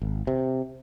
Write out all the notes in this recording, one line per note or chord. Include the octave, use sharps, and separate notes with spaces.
G#1
C3